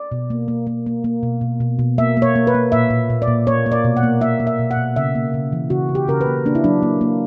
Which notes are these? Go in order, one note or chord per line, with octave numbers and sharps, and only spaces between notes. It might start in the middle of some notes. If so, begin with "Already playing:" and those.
Already playing: D5
B2
A#3
A#3
A#3
A#3
A#3
B2
B2
B2
B2
A#3 E5
A#3
C#5
A#3
B4
A#3
A#2 E5
A#2
A#2
D5
A#2
A#3 C#5
A#3
D5
B2
F#5
A#3
A#3 E5
A#3
E5
B2
F#5
B2
C#3 E5
A#3
C#3
E3
C#3 F#4
C#3
G4
C#3 A#4
B4
A#3
A#3 D4
E4
F#3 D4
A#3
A#3